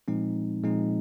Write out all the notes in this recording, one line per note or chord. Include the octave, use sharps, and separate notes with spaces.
A#2 F3 G#3 C4 D#4
A#2 F3 G#3 C4 D#4